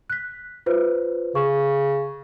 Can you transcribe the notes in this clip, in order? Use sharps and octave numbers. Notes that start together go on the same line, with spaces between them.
F#6 B6
F4 B4 C5
C#3 C#6